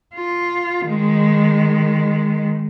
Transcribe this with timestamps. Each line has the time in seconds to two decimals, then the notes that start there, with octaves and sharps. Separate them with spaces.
0.15 F4
0.84 D#3 G#3